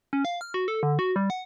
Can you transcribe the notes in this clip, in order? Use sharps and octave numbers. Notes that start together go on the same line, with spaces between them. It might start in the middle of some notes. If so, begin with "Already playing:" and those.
C#4
F5
F6
F#4
A4
D3
F#4
G3
F#5